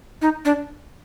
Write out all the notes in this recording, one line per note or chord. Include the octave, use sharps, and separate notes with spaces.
D#4
D4